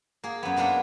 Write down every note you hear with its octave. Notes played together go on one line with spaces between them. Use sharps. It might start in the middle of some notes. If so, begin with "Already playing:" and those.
A#3 G#4
F#2 B3
G#3 A#3 B3 D4 A#4